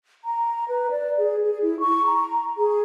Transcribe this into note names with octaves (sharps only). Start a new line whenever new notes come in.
A#5
B4
D5
G#4
G#4
E4
C#6
A#5
G#4